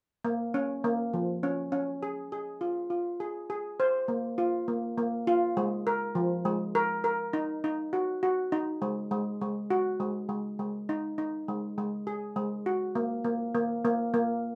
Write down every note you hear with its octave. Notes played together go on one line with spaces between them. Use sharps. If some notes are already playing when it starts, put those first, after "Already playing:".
A#3
C#4
A#3
F3
C#4
C#4
G#4
G#4
F4
F4
G#4
G#4
C5
A#3
F4
A#3
A#3
F4
G#3
A#4
F3
G#3
A#4
A#4
D#4
D#4
F#4
F#4
D#4
G#3
G#3
G#3
F#4
G#3
G#3
G#3
D#4
D#4
G#3
G#3
G#4
G#3
F#4
A#3
A#3
A#3
A#3
A#3